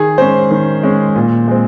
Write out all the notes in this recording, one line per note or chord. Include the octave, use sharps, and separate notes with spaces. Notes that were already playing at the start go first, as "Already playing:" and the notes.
Already playing: D#3 G#4
G#3 C#4 C5
D#3
G#3 C#4
A#2
G#3 C4